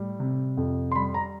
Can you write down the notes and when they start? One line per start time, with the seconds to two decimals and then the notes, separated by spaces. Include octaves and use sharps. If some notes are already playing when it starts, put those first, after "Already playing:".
Already playing: A2 G3
0.20 C3
0.57 F2
0.92 C6
0.95 G3 B5
1.14 A#5